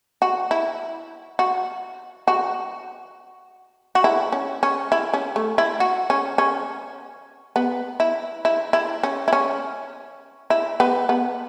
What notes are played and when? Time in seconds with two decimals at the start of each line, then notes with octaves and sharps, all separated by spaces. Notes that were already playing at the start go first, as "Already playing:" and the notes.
0.22 F#4
0.51 E4
1.39 F#4
2.28 F#4
3.95 F#4
4.04 E4
4.32 C#4
4.63 C#4
4.92 E4
5.14 C#4
5.36 A3
5.58 E4
5.80 F#4
6.10 C#4
6.38 C#4
7.56 B3
8.00 E4
8.45 E4
8.73 E4
9.03 C#4
9.28 E4
9.33 C#4
10.50 E4
10.80 B3
11.09 B3